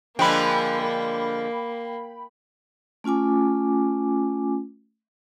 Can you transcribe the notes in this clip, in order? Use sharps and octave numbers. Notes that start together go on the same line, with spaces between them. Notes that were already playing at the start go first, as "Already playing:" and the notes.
D3 F3 G#3 A#3 G5 B5
A3 C#4 F4 G#5 D6